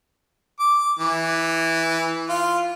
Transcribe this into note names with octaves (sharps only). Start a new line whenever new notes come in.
D6
E3
F4